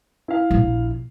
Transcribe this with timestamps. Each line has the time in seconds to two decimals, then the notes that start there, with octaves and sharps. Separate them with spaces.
0.28 E4 F5
0.51 A#1 A#2